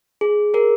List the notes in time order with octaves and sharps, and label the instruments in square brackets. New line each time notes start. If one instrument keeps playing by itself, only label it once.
[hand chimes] G#4
G#4 A#4